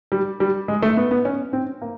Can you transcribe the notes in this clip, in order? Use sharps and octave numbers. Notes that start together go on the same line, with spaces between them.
G3
G3
G#3
A3
B3
B3
C#4
C4
A#3